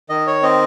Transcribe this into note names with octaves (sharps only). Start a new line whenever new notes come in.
D#3 D#5
C#5
C4 D#5